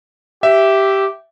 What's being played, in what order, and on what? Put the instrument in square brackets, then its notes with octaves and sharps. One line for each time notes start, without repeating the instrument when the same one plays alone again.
[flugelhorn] G4 [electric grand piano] E5